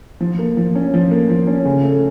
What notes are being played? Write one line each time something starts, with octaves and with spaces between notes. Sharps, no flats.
F3
A#3
F3
C#4
F3
A#3
F3
C#4
C#3
A3